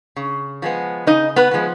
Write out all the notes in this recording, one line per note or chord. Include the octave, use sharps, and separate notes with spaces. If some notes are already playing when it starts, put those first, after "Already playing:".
C#3
F3 G#3 B3
C#3 D#4 D#5
B3 B4
F3 G#3 B3